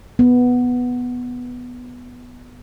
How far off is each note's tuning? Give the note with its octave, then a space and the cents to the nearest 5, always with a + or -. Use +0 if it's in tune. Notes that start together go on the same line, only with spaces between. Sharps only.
B3 +0